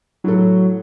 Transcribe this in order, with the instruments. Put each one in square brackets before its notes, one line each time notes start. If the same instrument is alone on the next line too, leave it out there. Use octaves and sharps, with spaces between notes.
[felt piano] A2 A4 [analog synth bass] F#3